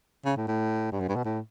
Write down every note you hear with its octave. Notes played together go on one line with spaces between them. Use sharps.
C#3
A2
A2
G2
F#2
G2
B2
A2